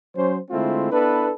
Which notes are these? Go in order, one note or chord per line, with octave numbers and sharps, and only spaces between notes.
F#3 C#4 C5
D3 G#3 A3 C4 E4 F4
B3 D4 E4 A4 B4